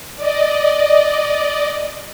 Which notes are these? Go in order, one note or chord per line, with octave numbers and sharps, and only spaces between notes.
D5 D#5